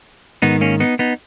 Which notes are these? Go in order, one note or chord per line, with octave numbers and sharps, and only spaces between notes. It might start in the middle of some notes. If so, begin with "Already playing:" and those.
G#2 D#3 B3 D#4
A#3 C#4
B3 D#4
B3 D#4